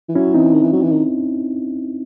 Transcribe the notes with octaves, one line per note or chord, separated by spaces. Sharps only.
E3
F#3 C#4 E4
E3 C4 D#4
D#3
E3
F#3
E3
D#3